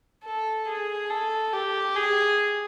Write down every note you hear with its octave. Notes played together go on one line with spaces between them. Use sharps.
A4
G#4
A4
G4
G#4